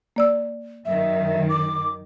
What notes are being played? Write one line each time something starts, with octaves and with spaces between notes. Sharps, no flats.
A#3 D5 E6
F#2 D#3 E5
D6